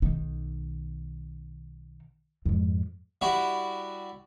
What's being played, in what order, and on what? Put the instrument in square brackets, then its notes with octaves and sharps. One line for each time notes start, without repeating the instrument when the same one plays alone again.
[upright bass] B1 D#3
F2 G#2
[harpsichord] G3 E4 F#4